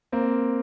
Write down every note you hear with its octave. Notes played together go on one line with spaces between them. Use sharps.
A#3 C4